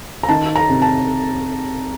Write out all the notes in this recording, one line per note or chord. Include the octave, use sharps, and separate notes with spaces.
A#5
D#3 A5
A#5
C3
A5